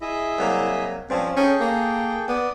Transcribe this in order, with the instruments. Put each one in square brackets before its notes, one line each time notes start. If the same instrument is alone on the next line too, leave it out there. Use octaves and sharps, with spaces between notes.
[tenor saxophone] E4 [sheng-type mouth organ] G#4 D#5 E5
[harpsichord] C2 F#3 A#3
[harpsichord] G2 F3 [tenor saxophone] C4 [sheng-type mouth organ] C#4
[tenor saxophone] C#4 [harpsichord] D#4 [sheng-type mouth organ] G#4 A4 G5
[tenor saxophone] A#3
[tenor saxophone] B3 [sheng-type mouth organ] D5 D#6